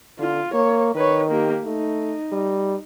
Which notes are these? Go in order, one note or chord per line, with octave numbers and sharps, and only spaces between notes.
D3 F4
A#3 C#5
D#3 B4 C#5
A#3 G4
A3 D#4
G3